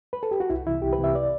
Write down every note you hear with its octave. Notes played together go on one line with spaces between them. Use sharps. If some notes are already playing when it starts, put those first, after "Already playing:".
B4
A4
G4
F#4
C2 E4
C3 E3 E4
C2 G4
B4
C3 E3 E5
D5